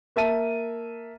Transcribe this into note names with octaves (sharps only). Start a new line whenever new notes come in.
A#3 E5 A5 D#7